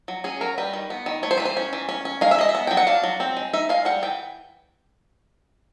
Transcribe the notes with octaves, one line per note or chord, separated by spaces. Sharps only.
F#3
C#4 G#4
F#3 A#4
G3 B4
D#3
B3
D#3
A3 C#5
C5
E3 B4
C5
C#4
E3
C#4
C#4
G#3 F5
E5
G#3 D#5
E5
B3
F#3 G5
F#5
D4 F5
F#3
C4
G#3
D#4 E5
G#3 F5
G3 F#5
E3 G5